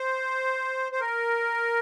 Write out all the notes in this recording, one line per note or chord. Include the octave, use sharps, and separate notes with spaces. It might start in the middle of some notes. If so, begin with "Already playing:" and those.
Already playing: C5
C5
A#4